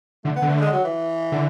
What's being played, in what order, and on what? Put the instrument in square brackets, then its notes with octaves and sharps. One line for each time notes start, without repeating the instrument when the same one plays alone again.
[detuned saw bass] D3 [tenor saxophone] A3
[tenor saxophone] B3
[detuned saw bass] D3
[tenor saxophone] A3
G#3
F#3
E3
[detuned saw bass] D3